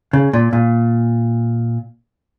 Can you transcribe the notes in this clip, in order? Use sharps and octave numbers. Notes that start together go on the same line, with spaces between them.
C#3
A#2
A#2